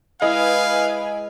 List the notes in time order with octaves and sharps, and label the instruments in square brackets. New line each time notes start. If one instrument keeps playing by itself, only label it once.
[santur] G#3 [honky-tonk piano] E4 G#4 D#5 [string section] B4 G#5 [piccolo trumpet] F5